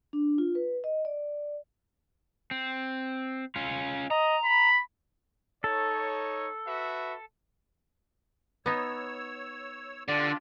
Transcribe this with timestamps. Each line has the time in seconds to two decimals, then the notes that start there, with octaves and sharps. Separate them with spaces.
0.13 D4
0.38 F4
0.55 B4
0.84 D#5
1.05 D5
2.51 C4
3.56 C#4 F4
4.11 D#5 A#5
4.45 B5
5.64 D#4 A4 C#5
6.67 F#4 B4 E5
8.66 B3 D#4 C#5 E6
10.08 D3 D4 F4 G4 D5